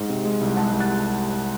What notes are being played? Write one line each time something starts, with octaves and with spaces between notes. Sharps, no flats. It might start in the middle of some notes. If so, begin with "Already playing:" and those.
Already playing: G#2
C3
G#3
C2
G#3 F#5 A5
C2
F#6 A6